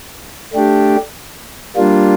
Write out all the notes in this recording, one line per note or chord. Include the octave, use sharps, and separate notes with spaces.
A3 D4 G4
G3 A#3 D4 F4